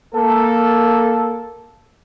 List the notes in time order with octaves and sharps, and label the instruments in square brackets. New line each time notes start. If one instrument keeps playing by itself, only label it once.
[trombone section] A#3 A4